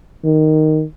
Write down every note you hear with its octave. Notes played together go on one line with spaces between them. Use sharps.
D#3